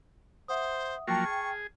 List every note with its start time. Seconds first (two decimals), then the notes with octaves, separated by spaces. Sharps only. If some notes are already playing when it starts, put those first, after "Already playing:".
0.48 C5 E5 F#5 D#6
1.07 F3 F#3 A#3 G5 A5 C#6 F6 A6
1.25 G#4